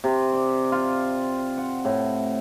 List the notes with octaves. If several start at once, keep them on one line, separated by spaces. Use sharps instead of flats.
C3
D5
F4
F#5
A2